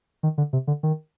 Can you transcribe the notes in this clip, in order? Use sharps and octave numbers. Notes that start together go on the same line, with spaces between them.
D#3
D3
C3
D3
D#3